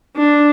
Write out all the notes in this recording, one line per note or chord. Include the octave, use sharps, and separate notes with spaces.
D4